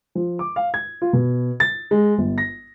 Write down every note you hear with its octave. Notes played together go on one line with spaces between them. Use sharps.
F3
D6
F5
G#6
F4
B2
A6
G#3
G1
A#6